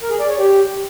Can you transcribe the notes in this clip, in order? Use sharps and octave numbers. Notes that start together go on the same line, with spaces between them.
A#4
G#4
D5
C#5
G4